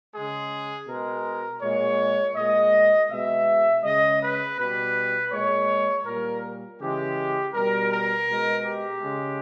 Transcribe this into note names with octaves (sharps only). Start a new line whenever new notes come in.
C#3 G#3 G#4
B2 G#3 A#4
A#2 G#3 C#5
A#2 G#3 D#5
B2 G#3 E5
C#3 G#3 D#5
B4
B2 G3 B4
A#2 G#3 C#5
A#2 G3 A#4
C#3 E3 G#3 G4
B2 G3 A#4
A#4
B2 G#3
G4
C#3 G#3